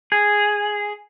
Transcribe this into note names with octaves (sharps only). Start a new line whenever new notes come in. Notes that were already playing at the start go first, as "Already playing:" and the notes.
G#4